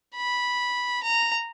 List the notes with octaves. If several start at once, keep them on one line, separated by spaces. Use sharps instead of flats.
B5
A#5